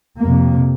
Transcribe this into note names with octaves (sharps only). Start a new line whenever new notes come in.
F2 C3 A#3